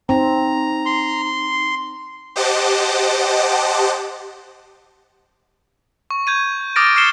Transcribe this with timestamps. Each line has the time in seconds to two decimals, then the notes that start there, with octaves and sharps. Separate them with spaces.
0.09 C4 D#4 A#5
0.86 C6
2.36 G4 C5 D#5 F#5 A5 D6
6.11 C#6
6.27 G6 G#6 D#7
6.76 D6 D#6 F6 A6 A#6 D7
6.96 F6 A6 C7 C#7 E7 G7